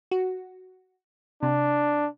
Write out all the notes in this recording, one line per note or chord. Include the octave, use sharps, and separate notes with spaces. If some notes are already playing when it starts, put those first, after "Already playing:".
F#4
C3 D4